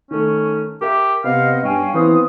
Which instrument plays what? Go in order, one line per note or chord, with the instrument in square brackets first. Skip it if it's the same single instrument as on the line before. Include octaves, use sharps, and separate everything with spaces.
[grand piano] D#3 A3 [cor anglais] C#4
[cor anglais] G4 [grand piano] A#4 E5
[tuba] C3 [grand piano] B3 [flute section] C5 D#5 F#5 [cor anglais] F5
[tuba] G2 [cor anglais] C#4 [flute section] F5 G5 G#5
[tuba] E3 [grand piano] B3 C4 [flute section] F5 D#6